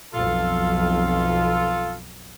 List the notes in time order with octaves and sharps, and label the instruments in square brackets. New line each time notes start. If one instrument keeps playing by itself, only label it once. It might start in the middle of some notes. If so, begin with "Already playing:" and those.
[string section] B1 F2 [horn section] F4 A4